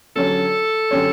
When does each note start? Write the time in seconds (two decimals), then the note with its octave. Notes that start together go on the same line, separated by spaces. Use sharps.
0.15 D3 F#3 C#4 G4 A4 C#5
0.91 D3 F#3 C#4 G4 C#5